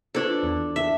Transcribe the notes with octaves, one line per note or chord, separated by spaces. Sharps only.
D4 F4 A4 B4 C5
E2
E5